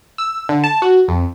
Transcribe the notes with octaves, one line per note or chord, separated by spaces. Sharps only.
E6
D3
A5
F#4
F2